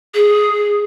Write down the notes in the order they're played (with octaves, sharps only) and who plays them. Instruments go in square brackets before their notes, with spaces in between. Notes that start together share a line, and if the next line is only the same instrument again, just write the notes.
[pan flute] G#4